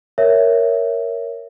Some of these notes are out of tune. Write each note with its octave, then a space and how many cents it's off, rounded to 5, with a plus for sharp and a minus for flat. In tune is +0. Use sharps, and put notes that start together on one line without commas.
A#4 +0 C#5 +0 E5 +0